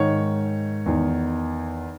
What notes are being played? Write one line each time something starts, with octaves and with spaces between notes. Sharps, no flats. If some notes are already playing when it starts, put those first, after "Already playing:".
Already playing: G#2 D#3 C#5
E2 D#3